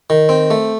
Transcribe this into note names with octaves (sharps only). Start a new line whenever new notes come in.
D#3
C4
A3